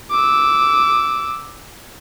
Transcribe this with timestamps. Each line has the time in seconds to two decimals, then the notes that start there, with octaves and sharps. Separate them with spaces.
0.11 D6 E6